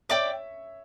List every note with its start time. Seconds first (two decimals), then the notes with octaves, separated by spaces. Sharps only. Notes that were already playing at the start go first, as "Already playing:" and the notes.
0.09 C#5 D5 E5 G5 D6